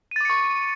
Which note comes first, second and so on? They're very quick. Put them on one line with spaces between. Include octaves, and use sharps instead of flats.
D#7 A6 D6 C#7 C#6